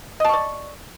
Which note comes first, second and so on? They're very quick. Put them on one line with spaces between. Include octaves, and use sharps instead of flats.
D#5 A5 C#6 D5